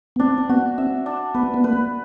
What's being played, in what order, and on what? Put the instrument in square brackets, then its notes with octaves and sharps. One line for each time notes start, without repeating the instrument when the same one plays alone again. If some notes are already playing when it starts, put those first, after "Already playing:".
[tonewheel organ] B3
[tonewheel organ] C4 [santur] D4
[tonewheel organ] C4
[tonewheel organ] B3 [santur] F#4
[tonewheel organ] C4 [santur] E5
[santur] D4
[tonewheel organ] B3 [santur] B4
[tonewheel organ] B3
[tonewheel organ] A#3 [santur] B4